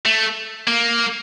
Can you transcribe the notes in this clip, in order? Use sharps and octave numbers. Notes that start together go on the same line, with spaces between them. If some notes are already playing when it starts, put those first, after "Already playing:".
A3
A#3